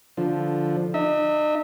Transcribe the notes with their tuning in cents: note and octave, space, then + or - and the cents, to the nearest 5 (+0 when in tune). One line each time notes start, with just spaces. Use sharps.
D3 +0 F3 +0
D#4 -45 E5 -25